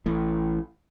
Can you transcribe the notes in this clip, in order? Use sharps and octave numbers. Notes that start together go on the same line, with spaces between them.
A1 A2